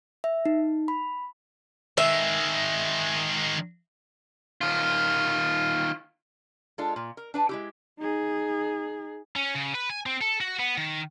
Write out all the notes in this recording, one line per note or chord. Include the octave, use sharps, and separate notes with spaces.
E5
D#4
B5
D#3 G#3 E5
D#3 F4
G#3 D4 F4 A4
A#2
A#4
D4 B4 A5
G#3 E4 G4
D#4 G#4
C#4
C#3
B4
G#5
C4
A4
F#4
B3
D#3